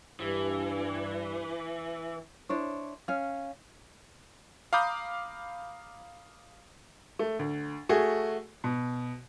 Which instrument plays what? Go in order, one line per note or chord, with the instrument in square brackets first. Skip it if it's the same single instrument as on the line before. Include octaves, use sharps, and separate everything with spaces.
[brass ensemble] G2 [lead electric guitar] E3
[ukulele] D4 E4 C5 C#5
C#4 F5
[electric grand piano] F5 A#5 B5 D6 D#6 G6
[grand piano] A3
D2
A3 F#4 G#4
B2